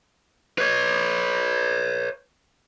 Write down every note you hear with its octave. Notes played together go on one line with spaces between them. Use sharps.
B4 C#5